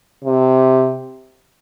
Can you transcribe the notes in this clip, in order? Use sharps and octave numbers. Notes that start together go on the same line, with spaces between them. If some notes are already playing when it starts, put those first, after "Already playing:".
C3